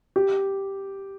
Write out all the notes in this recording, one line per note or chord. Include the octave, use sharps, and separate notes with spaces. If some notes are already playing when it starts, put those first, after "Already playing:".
G4